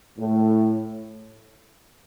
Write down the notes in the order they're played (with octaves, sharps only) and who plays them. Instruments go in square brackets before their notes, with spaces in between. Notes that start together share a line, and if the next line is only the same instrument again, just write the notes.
[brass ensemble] A2